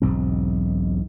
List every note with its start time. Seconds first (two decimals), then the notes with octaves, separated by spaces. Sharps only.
0.02 E1 B1 G#2 C4